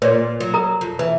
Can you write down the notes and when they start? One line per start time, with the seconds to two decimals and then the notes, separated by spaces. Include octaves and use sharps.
0.02 A#2 B4 C#5 D5
0.40 F#3
0.54 A#4 A#5 D#6
0.81 F2
0.99 E3 B4